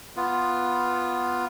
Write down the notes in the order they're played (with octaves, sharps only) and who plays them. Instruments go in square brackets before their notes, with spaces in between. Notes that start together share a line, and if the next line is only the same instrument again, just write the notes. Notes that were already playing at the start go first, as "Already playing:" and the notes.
[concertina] B3 F4